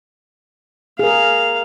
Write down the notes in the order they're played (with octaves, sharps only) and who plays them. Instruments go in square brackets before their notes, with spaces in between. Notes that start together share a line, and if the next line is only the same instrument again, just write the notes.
[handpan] G#4 A#4 [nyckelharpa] F5